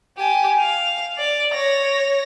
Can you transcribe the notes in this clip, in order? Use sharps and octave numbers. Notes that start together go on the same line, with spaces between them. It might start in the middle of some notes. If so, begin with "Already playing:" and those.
G4 G#5
F5
D5
C#5 A#6